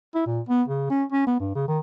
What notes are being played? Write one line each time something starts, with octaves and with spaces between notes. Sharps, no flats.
E4
A#2
B3
C#3
C#4
C#4
B3
G2
C#3
D#3